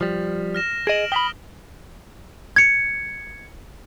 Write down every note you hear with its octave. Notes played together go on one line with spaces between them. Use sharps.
F3 G3
F6 A#6 E7
G#4 D#5 D7 E7 F#7
G5 B5 D#6 B6 G7
G#6 C#7